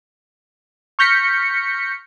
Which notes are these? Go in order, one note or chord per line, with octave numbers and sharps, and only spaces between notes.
C#6 F6 G6 A#6 B6 C#7